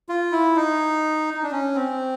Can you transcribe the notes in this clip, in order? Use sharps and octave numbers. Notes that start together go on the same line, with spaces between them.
F4
E4
D#4
D#4
D4
C#4
C4